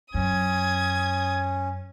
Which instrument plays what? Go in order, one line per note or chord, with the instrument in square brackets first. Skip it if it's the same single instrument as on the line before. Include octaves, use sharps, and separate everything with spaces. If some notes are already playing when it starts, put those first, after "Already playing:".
[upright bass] F#2 [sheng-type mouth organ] C#4 [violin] D#6 G#6